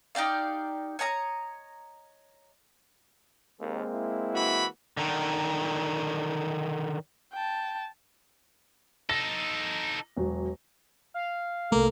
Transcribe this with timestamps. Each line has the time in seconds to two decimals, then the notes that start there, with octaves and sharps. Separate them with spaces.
0.15 D#4 G4 D5 F5
0.99 C#5 D#5 A5 A#5
3.60 D#2 G#3 A#3 C4
3.94 E4
4.34 E3 F#4 B5
4.97 D3 D#3
7.33 G5 A5
9.09 D#4 A4 A#6
10.17 E1 F#3
11.14 F5
11.72 C2 A3 A#3 A4